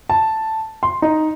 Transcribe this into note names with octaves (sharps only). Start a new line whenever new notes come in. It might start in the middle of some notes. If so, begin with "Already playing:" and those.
A5
C6
D#4